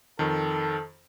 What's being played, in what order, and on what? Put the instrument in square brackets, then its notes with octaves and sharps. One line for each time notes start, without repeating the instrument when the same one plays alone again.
[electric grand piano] F2 D#3 [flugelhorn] A4